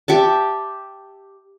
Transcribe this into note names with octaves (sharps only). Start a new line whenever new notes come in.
G4 E5 A5